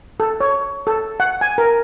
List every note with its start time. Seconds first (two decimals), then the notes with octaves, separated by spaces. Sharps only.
0.20 A4
0.41 C#5
0.87 A4
1.20 F#5
1.41 G#5
1.58 A#4